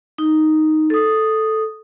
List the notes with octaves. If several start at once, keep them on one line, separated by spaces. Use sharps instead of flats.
D#4
A4 D#6